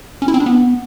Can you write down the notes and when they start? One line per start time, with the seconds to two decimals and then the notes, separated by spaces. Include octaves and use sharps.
0.22 C#4
0.28 E4
0.34 C4
0.40 D4
0.46 B3